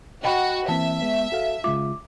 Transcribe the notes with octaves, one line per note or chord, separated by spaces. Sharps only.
F#4 D#5 G5 B5
E3 A#3 C4 E5 A5
G#3 B3
F#4 A4 F5
C#3 G#3 F4 D6